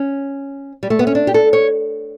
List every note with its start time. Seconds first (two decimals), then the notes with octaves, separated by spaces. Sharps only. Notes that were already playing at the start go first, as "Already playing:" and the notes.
Already playing: C#4
0.83 G3
0.90 A3
0.99 B3
1.07 C#4
1.15 D4
1.27 G4
1.34 A4
1.53 C#5